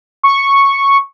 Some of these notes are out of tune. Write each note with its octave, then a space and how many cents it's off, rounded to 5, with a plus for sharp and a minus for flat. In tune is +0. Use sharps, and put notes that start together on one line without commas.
C#6 -5